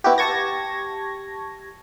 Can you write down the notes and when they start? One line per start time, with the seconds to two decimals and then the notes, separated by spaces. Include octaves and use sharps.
0.04 B3 E4 F#4 G4
0.18 G4 A5 C#6 G#6 A#6